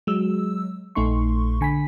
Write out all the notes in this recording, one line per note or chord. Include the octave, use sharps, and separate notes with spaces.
F#3 G#3 E6
A#1 A3 D#4 C6 C#6
D3 G#5 B5 B6